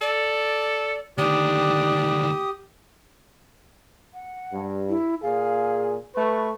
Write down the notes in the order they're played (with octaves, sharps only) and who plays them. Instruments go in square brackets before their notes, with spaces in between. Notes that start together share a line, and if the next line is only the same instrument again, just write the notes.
[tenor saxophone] A4 [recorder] D5
[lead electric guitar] D2 D#3 [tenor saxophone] D4 [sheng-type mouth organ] G4 [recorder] D#6
[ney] F#5
[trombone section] G2
[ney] E4
[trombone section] A#2 G#4 [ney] F5
[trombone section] A3 B4 [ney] C#6